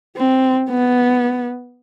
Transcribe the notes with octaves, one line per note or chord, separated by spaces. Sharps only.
C4
B3